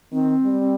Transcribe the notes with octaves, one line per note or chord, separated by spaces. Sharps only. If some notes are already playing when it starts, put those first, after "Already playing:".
D#3 C4
G3